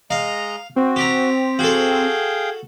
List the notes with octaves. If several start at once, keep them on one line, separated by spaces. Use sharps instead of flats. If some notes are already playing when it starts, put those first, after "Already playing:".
G#3 D#5 F5 A#5
C4 F#4
G4 A#5
F#4 G#4 A4 F5 G5